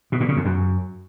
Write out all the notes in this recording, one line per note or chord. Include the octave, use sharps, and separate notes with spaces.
B2
A#2
C#3
F2
F#2